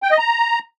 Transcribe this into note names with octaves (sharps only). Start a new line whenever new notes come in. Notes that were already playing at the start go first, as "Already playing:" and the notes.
G5
D#5
A#5